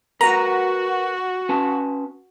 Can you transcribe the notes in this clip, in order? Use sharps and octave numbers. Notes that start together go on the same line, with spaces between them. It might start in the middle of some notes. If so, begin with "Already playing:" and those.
F#4 A#4 B4 F#5 A#5
C#4 B4 A5